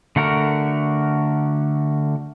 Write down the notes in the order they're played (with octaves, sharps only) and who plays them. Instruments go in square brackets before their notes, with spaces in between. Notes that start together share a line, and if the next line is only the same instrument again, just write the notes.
[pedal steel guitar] D3 A3 F#4 A#4